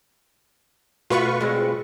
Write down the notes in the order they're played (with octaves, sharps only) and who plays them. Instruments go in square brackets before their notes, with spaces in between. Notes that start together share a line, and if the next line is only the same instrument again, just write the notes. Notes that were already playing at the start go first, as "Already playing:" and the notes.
[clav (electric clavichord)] B2 A3 F#4 [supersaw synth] F4 B4 C#6
[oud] G#3 C4